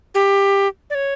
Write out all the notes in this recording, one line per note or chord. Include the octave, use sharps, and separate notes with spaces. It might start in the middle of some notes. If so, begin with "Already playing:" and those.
G4
D5
C#5